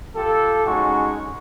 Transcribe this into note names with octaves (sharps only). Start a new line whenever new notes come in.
F4 G4 A4
G#3 C#4 D#4 F#4 C#6